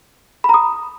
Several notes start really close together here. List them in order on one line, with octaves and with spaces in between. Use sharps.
B5 A#5 D#6